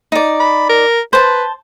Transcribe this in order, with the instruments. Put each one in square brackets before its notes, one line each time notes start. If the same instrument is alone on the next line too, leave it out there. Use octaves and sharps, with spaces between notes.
[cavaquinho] D#4 D5
[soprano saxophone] B5
A#4
[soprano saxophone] B4 [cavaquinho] C5 A5